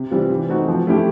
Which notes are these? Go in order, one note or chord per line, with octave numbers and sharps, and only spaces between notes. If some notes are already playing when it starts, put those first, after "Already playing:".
Already playing: C3
E3 G3 C4 F4
E3
A3 C4 D#4 F#4
F3
A3 C#4 E4 G4